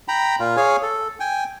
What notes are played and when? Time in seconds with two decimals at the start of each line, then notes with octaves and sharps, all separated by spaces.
0.08 G5 A#5 B5
0.39 A#2 F4
0.57 G#4 C#5 F5 G#5
0.83 A4
1.20 G5 G#5